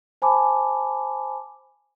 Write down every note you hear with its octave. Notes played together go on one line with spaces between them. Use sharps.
C5 G#5 A5 B5 D6